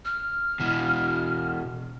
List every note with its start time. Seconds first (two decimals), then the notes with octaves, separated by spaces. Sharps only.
0.05 F6
0.60 B2 E3